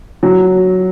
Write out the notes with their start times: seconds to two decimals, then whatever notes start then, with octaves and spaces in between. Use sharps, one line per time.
0.23 F#3